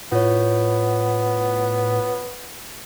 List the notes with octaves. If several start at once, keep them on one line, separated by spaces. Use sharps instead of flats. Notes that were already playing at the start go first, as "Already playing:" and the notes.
A2 B3 F4 C#5